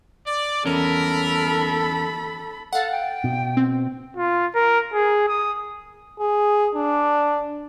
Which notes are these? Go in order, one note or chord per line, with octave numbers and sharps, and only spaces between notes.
D5
E2 C#4 A4 A#4 B5
A4 F5 F#5
G5
B2
C4
F4
A#4
G#4
D#6
G#4
D4